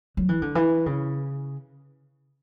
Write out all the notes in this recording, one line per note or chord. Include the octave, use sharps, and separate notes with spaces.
F#3
E3
D3
E3
C#3